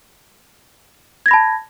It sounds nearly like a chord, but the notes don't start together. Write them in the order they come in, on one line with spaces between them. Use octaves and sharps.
G#6 A#6 B5 A5